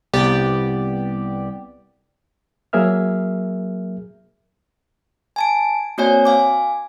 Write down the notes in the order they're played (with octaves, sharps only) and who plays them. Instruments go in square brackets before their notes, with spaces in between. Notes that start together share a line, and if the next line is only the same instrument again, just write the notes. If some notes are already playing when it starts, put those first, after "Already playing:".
[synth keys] C2 B3 G4 D5
[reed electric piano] F#3 A#3 G#4 A#4 E5 F6
[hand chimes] G#5 A5 D7
A#3 C4 F#4 C#5 D5 G#5
F5 G#5 D6